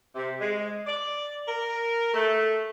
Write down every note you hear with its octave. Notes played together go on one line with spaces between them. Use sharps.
C3
G#3
D5
A#4
A3